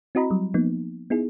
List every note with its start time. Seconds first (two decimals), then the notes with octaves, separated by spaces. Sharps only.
0.15 C4 E4 F#4 D#5 A#5 B5
0.30 F#3 G3
0.54 F3 A#3 B3 D#4
1.10 B3 D#4 E4 G#4